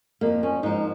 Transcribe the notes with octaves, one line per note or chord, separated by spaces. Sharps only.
F2 F3 A#3
C#4
G#2 F3 D#4